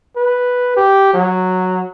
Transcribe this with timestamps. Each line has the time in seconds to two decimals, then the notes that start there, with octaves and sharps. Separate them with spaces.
0.16 B4
0.77 G4
1.13 F#3